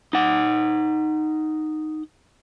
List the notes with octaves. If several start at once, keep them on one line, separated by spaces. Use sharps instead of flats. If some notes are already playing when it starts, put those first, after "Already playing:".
D#4 F#5